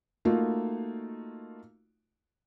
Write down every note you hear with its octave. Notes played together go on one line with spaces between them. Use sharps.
A3 A#3 D#4 F4 F#4